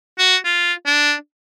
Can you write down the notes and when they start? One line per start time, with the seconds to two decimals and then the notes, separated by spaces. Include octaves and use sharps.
0.18 F#4
0.45 F4
0.86 D4